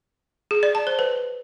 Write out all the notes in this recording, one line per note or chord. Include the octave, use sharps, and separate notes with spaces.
G#4
D5
A5
C5
B4